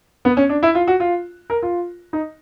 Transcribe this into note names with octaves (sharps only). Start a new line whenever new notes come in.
B3
C#4
D4
E4
F4
F#4
F4
A#4
F4
D#4